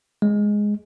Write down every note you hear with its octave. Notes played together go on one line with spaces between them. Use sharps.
G#3